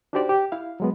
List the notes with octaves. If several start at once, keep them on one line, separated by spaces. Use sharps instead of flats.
D4 D#4 F#4 G4 C5 D5
G4
E4 F5
F#3 G#3 B3